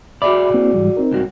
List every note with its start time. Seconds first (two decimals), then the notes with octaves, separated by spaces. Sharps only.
0.22 F#4 G#4 D5 E5 B5 D6
0.54 A#3 C4 E4
0.74 G#2 E3 G3
0.97 C4 D#4 A#4
1.11 C#2 G2 F#4